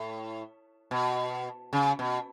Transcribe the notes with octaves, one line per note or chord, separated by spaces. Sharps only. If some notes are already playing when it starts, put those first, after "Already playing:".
Already playing: A2
B2
C#3
B2